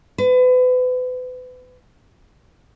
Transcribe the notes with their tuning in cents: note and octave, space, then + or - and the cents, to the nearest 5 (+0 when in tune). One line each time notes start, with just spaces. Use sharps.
B4 +35